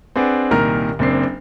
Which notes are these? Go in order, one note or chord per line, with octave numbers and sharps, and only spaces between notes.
C4 D4 G#4 B4 D5 F#5
C2 A#2 D#3 A#4 A#5 F6
F#1 A#3 C4 D4 C7